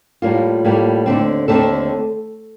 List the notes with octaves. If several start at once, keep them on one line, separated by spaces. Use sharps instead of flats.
A2 G3 A#3 F4
A2 G3 A#3
D#2 D3 A3 C4
D#2 D3 A3 C4 A4